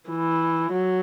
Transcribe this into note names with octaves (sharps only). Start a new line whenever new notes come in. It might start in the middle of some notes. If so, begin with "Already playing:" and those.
E3
F#3